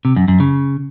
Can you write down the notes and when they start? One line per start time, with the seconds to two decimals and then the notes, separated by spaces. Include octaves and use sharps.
0.05 C3
0.16 F#2
0.28 F#2
0.40 C#3